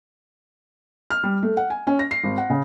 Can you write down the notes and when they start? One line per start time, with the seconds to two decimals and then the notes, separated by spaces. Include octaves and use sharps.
1.10 F6
1.23 G3
1.43 A3
1.57 F#5
1.70 G#5
1.87 C#4
1.99 A#6
2.11 C7
2.23 G#1
2.38 F#5
2.50 C#3